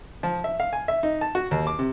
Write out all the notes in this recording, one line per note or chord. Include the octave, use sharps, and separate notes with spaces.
F3
E5
F5
G#5
E5
D#4
A5
F#4
D#2
D6
C3